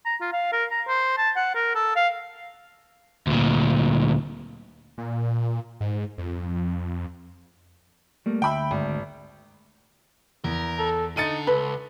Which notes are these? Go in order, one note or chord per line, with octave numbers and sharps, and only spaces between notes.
A#5
F4
F5
A#4
A#5
C5
A5
F#5
A#4
A4
F5
D2 A#2
A#2
G#2
F2
G3 A3 A#3
D2 E5 G5 B5
G#1
E2 A#4
A4
D3 D#4 A4 A6 C#7 D#7
C#2 A4 B4